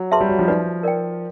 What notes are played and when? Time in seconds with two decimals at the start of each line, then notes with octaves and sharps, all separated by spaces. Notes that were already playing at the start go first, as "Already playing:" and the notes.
Already playing: F#3
0.12 G#4 B4 E5 A5 C6
0.21 G3
0.29 F#3
0.39 F3
0.48 D#4 F#4 B4 D5
0.83 A#4 D5 G5